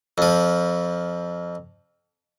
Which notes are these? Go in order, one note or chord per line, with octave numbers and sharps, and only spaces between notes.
F2 F3